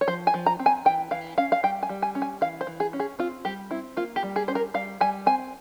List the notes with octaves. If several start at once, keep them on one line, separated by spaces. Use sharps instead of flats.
C#5
F3 C5
G#5
F3
A#5
C4
G#5
E3 G5
E3 F5
C#4 F5
F5
G3 G5
G#5
G3
G#5
C#4
G#5
E3 F5
C5
E3
G#4
C#4
G#4
C4 F4
G3 G4
C4 E4
A#3 F4
G4
G3
G#4
C#4 C5
A#4
G3 F5
G3 G#5
C4 G#5